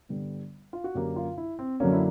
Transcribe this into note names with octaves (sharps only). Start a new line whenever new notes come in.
G2 D3 G3 B3
F4
F#4
F#2 D3 F#3 A#3 G4
F4
E4
C4
F#2 D3 F#3 A#3 C#4
E4